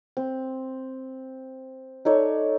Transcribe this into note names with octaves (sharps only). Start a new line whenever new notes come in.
C4
D#4 A4 C#5 D5